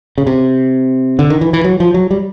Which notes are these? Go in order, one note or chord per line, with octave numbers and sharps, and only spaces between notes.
C#3
C3
D3
D#3
E3
E3
F#3
F3
F#3
G3